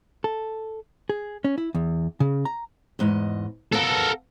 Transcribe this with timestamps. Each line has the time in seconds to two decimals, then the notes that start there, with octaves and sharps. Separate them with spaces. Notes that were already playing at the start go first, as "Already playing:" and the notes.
0.24 A4
1.09 G#4
1.44 C#4
1.58 E4
1.74 E2
2.20 C#3
2.45 A#5
2.99 E2 G#2 D#5
3.73 B3 A4 A#4 F5 F#5